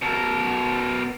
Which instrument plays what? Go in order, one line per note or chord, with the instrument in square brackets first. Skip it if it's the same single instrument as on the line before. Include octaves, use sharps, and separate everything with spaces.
[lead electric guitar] B2 A#4